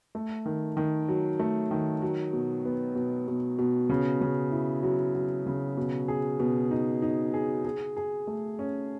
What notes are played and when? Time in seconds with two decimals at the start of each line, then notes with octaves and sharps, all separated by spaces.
0.15 A3
0.46 D#3
0.77 D#3
1.09 F#3
1.39 A3
1.71 D#3
2.02 F#3
2.33 B2
2.65 B3
2.95 B2
3.28 B2
3.58 B2
3.90 C#3
4.21 C#3
4.52 E4
4.83 F#3
5.14 F#3
5.46 C#3
5.77 B2
6.08 G#4
6.40 B2
6.71 D#4
7.02 D#4
7.34 G#4
7.65 G#4
7.97 G#4
8.27 A3
8.59 C#4